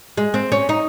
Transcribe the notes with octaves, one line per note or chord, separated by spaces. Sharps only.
G#3
C4
C#4
D#4